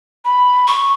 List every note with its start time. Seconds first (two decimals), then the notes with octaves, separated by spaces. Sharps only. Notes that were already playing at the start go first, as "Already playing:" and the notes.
0.25 B5
0.68 C#6